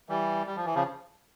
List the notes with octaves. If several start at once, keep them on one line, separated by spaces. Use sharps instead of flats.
E3 G3
G3
F3
E3
C#3 F3